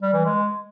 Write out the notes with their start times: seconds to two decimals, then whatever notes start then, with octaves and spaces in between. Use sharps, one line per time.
0.02 G3
0.13 E3
0.24 G#3